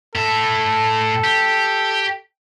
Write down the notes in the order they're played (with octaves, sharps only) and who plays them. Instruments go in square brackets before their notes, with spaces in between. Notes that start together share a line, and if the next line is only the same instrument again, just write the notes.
[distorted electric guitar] A2 E5 [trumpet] A4
[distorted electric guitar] G4